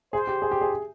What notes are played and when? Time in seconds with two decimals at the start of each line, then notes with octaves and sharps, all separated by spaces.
0.13 G#4 C5
0.27 G4
0.42 G#4
0.51 G4
0.61 G#4